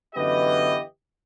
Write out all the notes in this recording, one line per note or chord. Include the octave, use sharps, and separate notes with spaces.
F#2 D3 E3 B3 G4 D#5